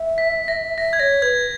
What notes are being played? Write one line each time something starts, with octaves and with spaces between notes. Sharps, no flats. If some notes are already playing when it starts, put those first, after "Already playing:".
Already playing: E5
B6
A#6
E5 A#6
G#6
C#5 A#6
B4 G#6